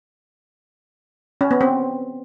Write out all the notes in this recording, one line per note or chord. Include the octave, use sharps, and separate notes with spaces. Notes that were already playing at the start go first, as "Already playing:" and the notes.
C#4
B3
C4